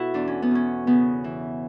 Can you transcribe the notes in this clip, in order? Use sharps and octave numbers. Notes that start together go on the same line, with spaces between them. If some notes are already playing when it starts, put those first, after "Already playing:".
Already playing: B2 E4 F#4 A4
E2 D4
C#4
B3
B2 C#4
C#3 B3
E3